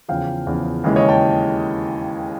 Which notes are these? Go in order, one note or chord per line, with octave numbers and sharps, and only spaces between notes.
E2 C#3 F3 F5 G5
E2 C#3 F3
D#2 C#3 E3 G#3
C#5 D#5
G5 A5